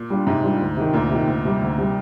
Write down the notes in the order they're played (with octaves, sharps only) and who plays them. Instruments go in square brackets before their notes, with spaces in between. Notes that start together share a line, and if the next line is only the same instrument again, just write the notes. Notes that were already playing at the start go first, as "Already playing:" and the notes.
Already playing: [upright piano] A#2
[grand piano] G3 D4 F4
[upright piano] G#2 [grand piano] C3
[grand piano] G3 D4 F4
D2
C3 D#3
[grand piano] D2 [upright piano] A#2
[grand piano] C3 D#3
D2
C3 G3
D2
C3 G3